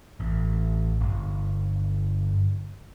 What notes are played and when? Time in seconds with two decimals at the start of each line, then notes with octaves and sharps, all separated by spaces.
0.20 A1
1.01 G1